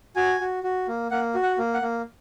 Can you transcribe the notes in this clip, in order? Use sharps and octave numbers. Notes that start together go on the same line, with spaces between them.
F#4 G#5
F#4
F#4
A#3
A#3 F#5
F#4
F#5
A#3
F#5
A#3